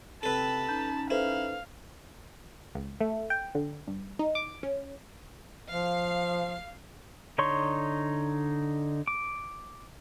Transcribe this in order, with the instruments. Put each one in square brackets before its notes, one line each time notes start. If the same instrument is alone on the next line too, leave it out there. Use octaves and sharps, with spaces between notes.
[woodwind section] C3 C4 [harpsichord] A4 B4 [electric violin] A5 B5
[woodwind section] C#4 D#4 [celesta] A#5 G6
[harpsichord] E4 [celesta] A4 B4 C5 [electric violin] F5
[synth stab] C#2
A3
G5
D3
G2
D#4
D6
C#4
[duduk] F3 [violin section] F5
[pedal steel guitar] D3 D#4 C#5 C6 C#6
D6